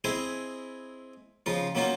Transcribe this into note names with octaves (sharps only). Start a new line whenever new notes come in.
C4 E4 G#4 D#5 G#5
C#3 F3 D#4 F4
F#3 A#3 C#4 D#4 F4